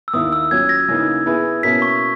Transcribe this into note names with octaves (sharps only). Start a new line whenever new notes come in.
E6
D#2 D#3 A#3 E4 D#6
E6
A#2 F#3 C#4 F#4 G#6
A#6
C#3 E3 A#3 D#4
E3 B3 E4 G#4 B4
B2 A#3 C#4 E4 A#4 B6
C#6